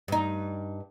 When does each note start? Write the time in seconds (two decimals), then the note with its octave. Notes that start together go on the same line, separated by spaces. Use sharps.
0.08 G2 D#4